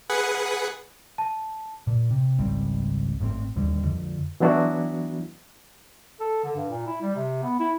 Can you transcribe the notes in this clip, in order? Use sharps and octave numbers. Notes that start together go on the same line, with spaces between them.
G#4 B4 F#5
A5
A#2
C3
G#1 C#2 G3 C4
G#1 A2 F3 C4
D1 D#2 D3 G3
F2 D3
E3 F#3 B3 D4 E4 F#4
A4
D3
G2
A#2
E4
G3
C3
B3
E4